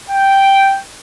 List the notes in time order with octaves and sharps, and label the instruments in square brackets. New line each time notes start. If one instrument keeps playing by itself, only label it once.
[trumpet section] G5